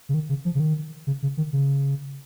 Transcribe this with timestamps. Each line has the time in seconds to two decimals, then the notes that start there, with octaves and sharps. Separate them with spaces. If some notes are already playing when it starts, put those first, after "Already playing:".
0.09 C#3
0.14 D#3
0.29 C#3
0.45 F3
0.55 C#3
0.60 D#3
1.07 C#3
1.23 C#3
1.37 D#3
1.53 C#3